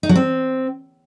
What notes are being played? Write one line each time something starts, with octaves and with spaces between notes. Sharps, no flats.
D#4
F#3
C4